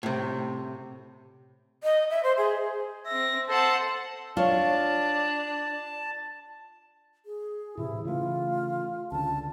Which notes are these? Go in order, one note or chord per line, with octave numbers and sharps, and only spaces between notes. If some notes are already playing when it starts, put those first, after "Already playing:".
A2 C3
D#5
E5
C5
G#4
C4 E5 A#6
A4 C5 F#5 A5
D4 F4 C#5 A5
G#4
A2 C3 E3 E4
C#3 E3 A3 F4
C#2 D3 A5